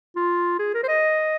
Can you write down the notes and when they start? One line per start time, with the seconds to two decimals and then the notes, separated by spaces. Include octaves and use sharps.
0.16 F4
0.59 G#4
0.74 A#4
0.83 C5
0.88 D#5